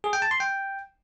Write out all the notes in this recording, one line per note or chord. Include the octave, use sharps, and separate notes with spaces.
G#4
G5
A5
C6
G5